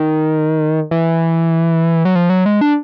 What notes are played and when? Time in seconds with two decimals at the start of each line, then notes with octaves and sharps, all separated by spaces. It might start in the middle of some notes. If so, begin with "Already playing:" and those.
Already playing: D#3
0.91 E3
2.05 F#3
2.15 F3
2.30 F#3
2.46 G#3
2.61 D4